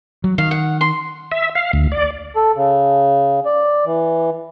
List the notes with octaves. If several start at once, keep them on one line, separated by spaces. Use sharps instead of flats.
F#3
D#3 F5
F#5
C6
E5
F5
D2
D5
A4
C#3
D5
E3